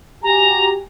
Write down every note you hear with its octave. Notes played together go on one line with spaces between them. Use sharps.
F#4 G4 G#5 A#5